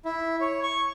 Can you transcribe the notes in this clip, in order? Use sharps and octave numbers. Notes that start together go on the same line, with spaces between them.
E4
C#5
C#6